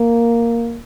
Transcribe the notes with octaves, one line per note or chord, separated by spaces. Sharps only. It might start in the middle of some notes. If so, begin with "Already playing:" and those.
Already playing: A#3